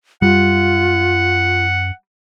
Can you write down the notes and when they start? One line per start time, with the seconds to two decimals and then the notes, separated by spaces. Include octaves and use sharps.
0.22 F#2 G3 F4 F#5